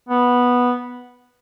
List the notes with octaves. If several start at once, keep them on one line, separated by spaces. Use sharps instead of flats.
B3